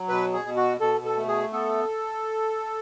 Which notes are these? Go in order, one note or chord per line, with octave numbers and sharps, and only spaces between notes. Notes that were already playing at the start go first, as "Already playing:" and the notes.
Already playing: F#3
B2 B4
G#4
B2
F#4
B2 A4
A4
A3
G#4
B3 A4